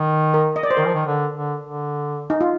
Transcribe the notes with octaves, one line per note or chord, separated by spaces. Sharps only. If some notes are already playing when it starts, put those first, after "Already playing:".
Already playing: D#3
A#4
D#5
D5
C5
D#3 A#4
F3
D#3
D3
D3
D3
D#4
F4